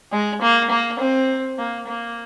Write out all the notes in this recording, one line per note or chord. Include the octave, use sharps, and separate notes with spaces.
G#3
A#3
A#3
C4
A#3
A#3